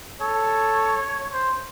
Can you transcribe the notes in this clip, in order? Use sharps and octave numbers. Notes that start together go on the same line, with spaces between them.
A4 C#5
C5